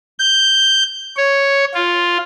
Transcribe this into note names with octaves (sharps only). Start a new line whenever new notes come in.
G6
C#5
F4